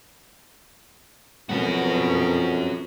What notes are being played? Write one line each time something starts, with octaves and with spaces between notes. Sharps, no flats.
F2 B2 C#4 F#4 A#4